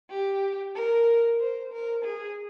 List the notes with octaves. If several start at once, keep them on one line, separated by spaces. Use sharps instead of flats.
G4
A#4
C5
A#4
G#4